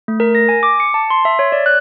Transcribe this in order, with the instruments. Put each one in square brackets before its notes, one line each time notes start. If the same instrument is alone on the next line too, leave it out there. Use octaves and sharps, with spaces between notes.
[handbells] A3
A#4
A#6
G#5
D6
C#7
A5
C6
E5
C#5
D5
F#6